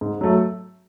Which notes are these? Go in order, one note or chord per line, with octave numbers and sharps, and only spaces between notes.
G#2
F#3 A3